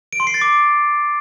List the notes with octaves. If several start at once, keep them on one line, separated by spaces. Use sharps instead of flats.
D7
C6
C7
A6
D6